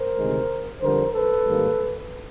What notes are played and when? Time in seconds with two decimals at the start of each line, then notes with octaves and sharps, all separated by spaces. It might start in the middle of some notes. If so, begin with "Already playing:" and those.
Already playing: A#4 C5
0.17 D2 C3 D#3 G#3
0.81 F2 D3 G3 A#4 C5
1.13 A4 B4
1.46 G#2 D#3 G3 A#3